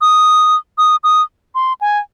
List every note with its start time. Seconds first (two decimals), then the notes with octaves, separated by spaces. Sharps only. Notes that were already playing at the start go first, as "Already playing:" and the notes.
0.01 D#6
0.78 D#6
1.04 D#6
1.55 C6
1.81 G#5